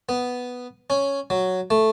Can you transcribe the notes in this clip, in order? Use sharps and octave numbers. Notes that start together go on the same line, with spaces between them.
B3
C#4
F#3
A3